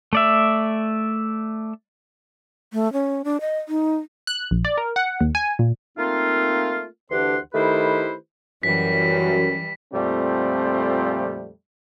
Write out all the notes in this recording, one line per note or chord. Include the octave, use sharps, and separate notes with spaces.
A3 D5 E5
A3
C#4
D4
D#5
D#4
F#6
A#1
D5
A#4
F#5
D#2
G#5
A#2
A3 A#3 C4 D#4 F4
D2 E3 D4 G4 F#5 C6
D#3 A3 E4 G4 B4 C5
F#2 E3 G3 B6
F2 A#2 F3 G3 A3 C4